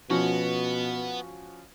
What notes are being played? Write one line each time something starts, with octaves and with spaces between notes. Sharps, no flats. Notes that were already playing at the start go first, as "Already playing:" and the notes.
B2 F3 B3 C#4 F#4